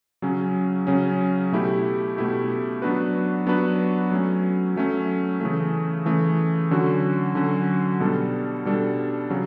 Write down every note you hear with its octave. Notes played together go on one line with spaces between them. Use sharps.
C#3 F#3 C#4
C#3 F#3 C#4
B2 A3 E4 G4
B2 A3 E4 G4
F#3 B3 D4 F#4 B4
F#3 B3 D4 F#4 B4
F#3 A3 C#4
F#3 A3 C#4
C#3 E3 A3
C#3 E3 A3
D3 F#3 C#4 F#4
D3 F#3 C#4 F#4
B2 G3 D4 A4
B2 G3 D4 A4
C#3 F#3